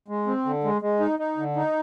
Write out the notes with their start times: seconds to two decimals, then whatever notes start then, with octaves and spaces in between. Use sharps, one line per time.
0.08 G#3
0.27 C4
0.45 D3
0.64 G#3
0.82 G#3
1.00 D#4
1.19 D#4
1.37 D3
1.56 D#4